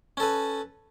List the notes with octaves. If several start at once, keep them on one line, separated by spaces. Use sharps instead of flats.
C#4 A4 B4